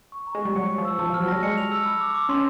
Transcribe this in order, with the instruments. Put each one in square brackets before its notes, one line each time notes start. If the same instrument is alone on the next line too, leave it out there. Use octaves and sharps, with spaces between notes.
[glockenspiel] C#6
A#5
[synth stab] G#3
[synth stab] G3 [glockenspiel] C#6
[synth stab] F#3 [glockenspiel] C#7
[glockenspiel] C#7
[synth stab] F3
[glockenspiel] E6
[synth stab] F3 [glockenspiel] A5
[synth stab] F3
[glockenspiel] F6
[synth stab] F#3
[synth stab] G3 [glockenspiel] A#6
[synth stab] G#3 [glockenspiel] C#7
[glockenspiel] F7
E6
B5
D6
D6
[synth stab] C#4 [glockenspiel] C6